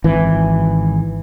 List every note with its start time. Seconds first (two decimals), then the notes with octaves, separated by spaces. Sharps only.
0.04 G#1 E3